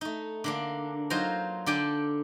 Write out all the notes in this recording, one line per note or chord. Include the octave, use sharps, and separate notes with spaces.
A3 D#4
D3 A#3 D4
F#3 D#4 F4 C5 A#5
D3 D4 A4 D5 G5 G#5